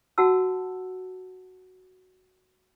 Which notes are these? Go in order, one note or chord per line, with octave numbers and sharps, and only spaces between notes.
F#4 F#5 A5 E6